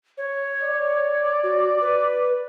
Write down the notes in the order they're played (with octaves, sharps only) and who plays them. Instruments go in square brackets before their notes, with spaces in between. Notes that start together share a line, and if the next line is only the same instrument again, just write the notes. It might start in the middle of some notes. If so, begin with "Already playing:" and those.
[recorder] C#5
[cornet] D5
[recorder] F#4
B4